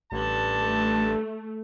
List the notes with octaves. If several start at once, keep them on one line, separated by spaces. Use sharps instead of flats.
A1 G2 D3 A5
A3